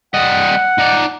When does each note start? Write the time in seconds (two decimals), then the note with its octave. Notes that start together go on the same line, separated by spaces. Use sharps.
0.14 G3 D#5 F#5
0.79 D#4 D5